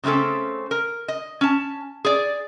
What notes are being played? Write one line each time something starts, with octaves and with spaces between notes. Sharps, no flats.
C#3 A3 C4 C#4 A4
A#4
D#5
C#4 A5
G#4 D5